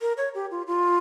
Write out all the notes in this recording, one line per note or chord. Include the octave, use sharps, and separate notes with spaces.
A#4
C#5
G4
F4
F4